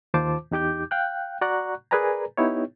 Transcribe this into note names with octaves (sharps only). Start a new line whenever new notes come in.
D#2 D#3 F4 C5 A5 D6
E2 D#4 G4 D6 G6
F5 G5 F#6
F#4 D5 F#5 A#5 C#6 F#6
G#4 A#4 B4 D5 G#5 A#5
B3 D#4 E4 G4 C#5